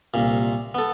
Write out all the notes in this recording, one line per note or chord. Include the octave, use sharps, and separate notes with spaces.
C2 A#2
B3 A4